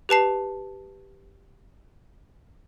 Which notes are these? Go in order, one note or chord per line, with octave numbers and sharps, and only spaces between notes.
G4 B4 A5 C7